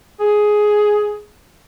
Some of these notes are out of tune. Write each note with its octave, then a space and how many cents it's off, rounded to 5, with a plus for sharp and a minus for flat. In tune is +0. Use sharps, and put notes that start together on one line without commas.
G#4 +10